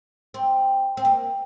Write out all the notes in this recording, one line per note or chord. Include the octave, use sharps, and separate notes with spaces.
C4
C4
A#3